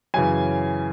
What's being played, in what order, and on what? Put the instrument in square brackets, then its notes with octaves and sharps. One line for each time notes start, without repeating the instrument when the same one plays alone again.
[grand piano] F#2 C#3 E3 G#5